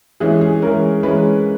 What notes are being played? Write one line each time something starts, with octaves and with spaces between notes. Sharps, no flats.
E3 G#3 C#4 G#4
G#4
E3 G#3 C#4 A#4
E3 G#3 C#4 B4